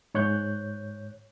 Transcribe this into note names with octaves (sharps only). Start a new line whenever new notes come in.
G#2 C#5 F#6 G6